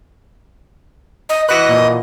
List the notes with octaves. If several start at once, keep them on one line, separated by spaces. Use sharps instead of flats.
D#5
E3 F#4 B4 D#5 F#6 A#6
A#2